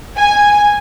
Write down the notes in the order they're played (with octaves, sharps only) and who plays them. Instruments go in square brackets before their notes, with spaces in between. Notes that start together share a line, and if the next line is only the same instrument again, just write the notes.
[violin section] G#5